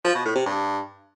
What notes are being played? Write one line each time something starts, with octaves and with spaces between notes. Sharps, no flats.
F3
B2
A2
C3
G2